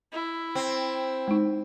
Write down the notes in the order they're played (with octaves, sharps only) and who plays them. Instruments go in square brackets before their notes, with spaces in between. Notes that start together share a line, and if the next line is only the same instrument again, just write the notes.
[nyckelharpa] E4
[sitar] C4
[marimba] G#3 D#4